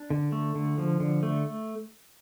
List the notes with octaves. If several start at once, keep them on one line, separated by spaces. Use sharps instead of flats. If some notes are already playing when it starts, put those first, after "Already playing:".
Already playing: D4
D3
A3
D3
F3
D3
A3